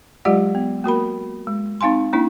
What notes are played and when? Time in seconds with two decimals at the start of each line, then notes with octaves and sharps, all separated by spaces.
0.25 F#3 G#3 F4 G4 D5 F#5
0.55 B3
0.84 A#3 F#4 A#4 B5
1.47 G#3
1.81 C4 D#4 F5 G#5 C6
2.13 A#3 C#4 D4 E4